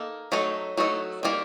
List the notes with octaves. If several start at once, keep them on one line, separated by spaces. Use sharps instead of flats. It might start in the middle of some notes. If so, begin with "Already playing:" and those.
Already playing: A#3 D#4 A4
F#3 A3 D#4 A4
F#3 A3 D#4 A4
D#3 G3 A#3